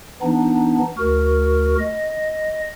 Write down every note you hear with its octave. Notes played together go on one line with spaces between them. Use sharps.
E3 B3 D4 D#4
D2 F#4 A#4
D#5